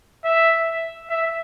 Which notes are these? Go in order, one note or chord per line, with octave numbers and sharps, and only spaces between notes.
E5
E5